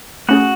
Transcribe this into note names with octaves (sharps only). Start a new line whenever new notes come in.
A3 C#4 F#4 G#4 F#5